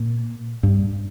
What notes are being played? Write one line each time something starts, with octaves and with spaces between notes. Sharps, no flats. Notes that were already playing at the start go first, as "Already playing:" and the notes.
Already playing: A#2
G2